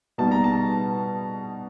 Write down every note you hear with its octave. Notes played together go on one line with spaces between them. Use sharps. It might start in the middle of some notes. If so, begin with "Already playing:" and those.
B2 G3 B3 D#4 A5
A#5
A5